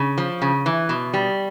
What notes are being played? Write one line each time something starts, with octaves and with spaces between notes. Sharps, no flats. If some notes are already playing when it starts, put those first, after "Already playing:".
Already playing: C#3
F3
C#3
E3
B2
G3